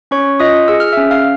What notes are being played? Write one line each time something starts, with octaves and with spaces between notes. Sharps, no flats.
C#4 C#5 C#6
F4 D#5 D#6
G#4 E6
F6
C#4 E5 E6
F5 F6